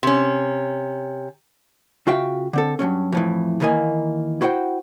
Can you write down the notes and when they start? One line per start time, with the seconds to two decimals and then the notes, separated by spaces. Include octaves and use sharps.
0.03 C3 C#4
2.07 C#3 F4 F#4 E5 F5 G5
2.53 D3 C4 A4
2.79 G2 C#3 F#3 C#4
3.12 F2 A2 E3
3.60 D#2 D#3 E3 A#3 D#5 G#5
4.41 E4 F#4 C5 F#5 G5